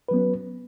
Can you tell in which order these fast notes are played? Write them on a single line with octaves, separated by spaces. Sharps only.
B4 F#3 B3 C#4